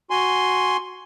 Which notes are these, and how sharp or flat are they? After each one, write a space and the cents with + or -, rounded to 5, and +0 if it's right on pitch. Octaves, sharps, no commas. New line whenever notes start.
F#4 +0 G#5 +0 C6 +0